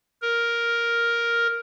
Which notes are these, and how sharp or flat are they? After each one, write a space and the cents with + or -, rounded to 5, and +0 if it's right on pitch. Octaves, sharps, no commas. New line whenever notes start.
A#4 +5